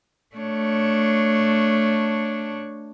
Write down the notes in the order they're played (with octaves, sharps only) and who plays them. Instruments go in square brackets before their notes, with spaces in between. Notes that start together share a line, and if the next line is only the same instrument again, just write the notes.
[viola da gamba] A3 D4 C#5